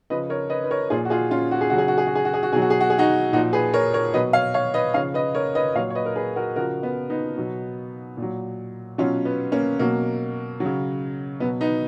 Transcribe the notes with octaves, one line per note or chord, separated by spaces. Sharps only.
C#3 F3 B4 D#5
A#4 C#5
B4 D#5
B4
A#4 C#5
A#2 F3 F4 G#4
F#4
F4 G#4
C#4 F4
F#4
G#4
C#3 F#3 F#4
G#4
F#4
G#4
F#4
G#4
F#4
G#4
F#4
B2 F#3 G#4
F#4
G#4
F#4
G#4
D#4 F#4
A#2 F3 D#4 F#4
G#4 B4
A#4 C#5
A#4 C#5
B2 F#3 B4 D#5
C#5 F5
C#5 F5
B4 D#5
C#3 F3 C#5 F5
B4 D#5
A#4 C#5
B4 D#5
A#2 F#3 C#5 F5
C#5
B4 D#5
A#4
G#4 B4
F#4 A#4
C#3 F3 F#4 A#4
B3
B3 D#4
B2 F#3
A#2
F#3
B2 F#3 C#4 F4
B3
A#3 C#4
B2 F#3 A#3
C#3 F#3
B2 F#3 B3
B3 D#4